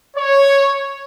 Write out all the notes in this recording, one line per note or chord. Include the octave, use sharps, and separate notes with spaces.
C#5